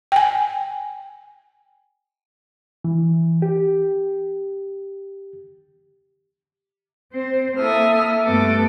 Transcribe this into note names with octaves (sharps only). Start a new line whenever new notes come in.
G5 G#5
E3
G4
C4 C5
A#3 E4 A4 E5 D#6 F6
G2 A3 B3 A4 D6